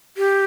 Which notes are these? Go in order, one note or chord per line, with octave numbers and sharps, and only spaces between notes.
G4